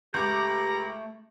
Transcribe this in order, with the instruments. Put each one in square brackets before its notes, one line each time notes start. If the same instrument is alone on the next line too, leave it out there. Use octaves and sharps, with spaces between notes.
[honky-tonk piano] C#2 D6 [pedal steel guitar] A3 C#6 G6 [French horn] G4 [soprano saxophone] A#5